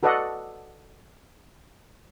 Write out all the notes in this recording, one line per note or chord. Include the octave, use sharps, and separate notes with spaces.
F#4 A4 B4 D5 D#5 F#5